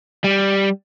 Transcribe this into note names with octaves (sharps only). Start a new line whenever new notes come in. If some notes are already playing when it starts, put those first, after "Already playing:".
G3